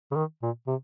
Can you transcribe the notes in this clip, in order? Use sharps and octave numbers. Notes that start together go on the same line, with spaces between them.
C#3
D#3
A#2
C3